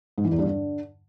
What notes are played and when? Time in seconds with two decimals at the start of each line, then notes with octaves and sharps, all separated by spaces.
0.18 G#2
0.25 E3
0.32 E2
0.39 G2
0.46 D3